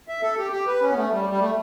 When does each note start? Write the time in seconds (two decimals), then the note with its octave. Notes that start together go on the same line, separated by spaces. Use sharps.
0.08 E5
0.22 A4
0.38 G4
0.52 G4
0.67 B4
0.81 C#4
0.91 B3
0.96 A3
1.11 G3
1.29 G3
1.40 A3